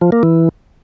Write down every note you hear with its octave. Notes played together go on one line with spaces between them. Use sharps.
F3
A#3
E3